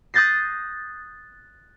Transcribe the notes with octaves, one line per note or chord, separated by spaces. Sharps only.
D#6 F#6 G6 A6 A#6 C7